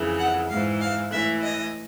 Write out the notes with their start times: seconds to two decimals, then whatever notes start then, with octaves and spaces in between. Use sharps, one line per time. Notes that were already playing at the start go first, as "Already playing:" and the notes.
Already playing: F2 C#3 E3
0.18 F#5
0.49 G#2 E3 F5
0.80 F5
1.12 A2 E3 E5
1.43 D#5